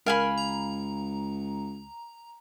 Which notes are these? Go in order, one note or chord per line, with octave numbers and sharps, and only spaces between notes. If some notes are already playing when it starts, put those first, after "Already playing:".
C#2 A#4 F5 G#5 B5
A#5